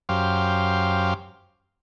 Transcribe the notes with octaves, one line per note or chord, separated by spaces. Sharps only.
F#2 G4 C5 F5